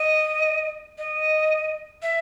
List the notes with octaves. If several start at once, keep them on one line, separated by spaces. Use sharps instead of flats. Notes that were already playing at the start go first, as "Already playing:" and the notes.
Already playing: D#5
D#5
E5